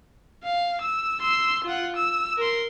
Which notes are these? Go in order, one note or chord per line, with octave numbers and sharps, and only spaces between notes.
F5
E6
C6 E6
F4 F#5
E6
A#4 C6